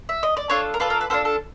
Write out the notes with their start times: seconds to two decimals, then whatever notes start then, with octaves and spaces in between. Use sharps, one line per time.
0.09 E5
0.23 D#5
0.37 D5
0.50 D4 F4 A4 C#5
0.74 A#4
0.80 D4 F4 A4 B4
0.90 A#4
1.01 B4
1.10 D4 F4 A4 C5
1.25 A4